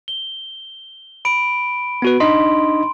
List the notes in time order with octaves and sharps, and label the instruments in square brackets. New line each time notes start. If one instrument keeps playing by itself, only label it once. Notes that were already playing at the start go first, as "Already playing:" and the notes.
[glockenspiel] G7
B5 D7
[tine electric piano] B3 F#4 B4
[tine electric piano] D4 D#4 D#5 [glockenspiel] C6